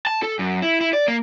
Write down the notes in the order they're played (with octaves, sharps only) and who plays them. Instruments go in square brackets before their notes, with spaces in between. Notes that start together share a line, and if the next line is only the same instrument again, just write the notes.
[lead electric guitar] A5
A4
F#2
E4
E4
D5
A#3